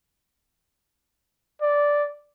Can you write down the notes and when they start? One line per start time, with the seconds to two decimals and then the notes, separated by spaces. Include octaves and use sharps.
1.62 D5